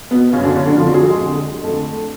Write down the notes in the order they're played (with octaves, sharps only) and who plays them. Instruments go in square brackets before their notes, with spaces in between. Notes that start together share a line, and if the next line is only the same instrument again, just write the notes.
[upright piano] B2 B3
C#3 C#4
F#2
D3 D4
C#3 C#4
D3 D4
F2 F3 F4
D3
F#3 F#4
G#4
F#3 F#4
G#3 G#4
F2 D3
F2 D3 A3 A4